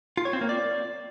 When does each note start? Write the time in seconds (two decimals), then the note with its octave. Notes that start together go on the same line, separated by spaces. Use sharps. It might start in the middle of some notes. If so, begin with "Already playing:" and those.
0.17 F4
0.25 C#5
0.33 C4
0.41 A#3
0.49 D5